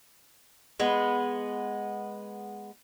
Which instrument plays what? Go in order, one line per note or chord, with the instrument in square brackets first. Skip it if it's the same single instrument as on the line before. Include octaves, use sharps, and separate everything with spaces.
[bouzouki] G#3 B3